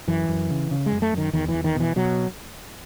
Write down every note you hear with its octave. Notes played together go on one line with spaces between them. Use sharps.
F#2 E3
F#2
C#3
C#3
G#3
F#2
A3
F#2 D#3
E2 D#3
E3
E2
D#3
B2 E3
B2 F#3